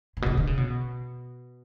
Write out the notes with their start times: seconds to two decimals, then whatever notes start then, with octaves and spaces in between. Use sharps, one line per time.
0.17 A2
0.22 B2
0.26 C#3
0.37 D3
0.47 C#3
0.57 B2